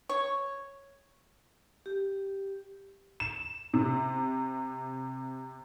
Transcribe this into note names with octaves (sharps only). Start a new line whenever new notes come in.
C#5
G4
E7
C3